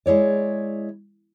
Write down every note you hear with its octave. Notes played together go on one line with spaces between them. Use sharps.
G#3 E4 C#5 D5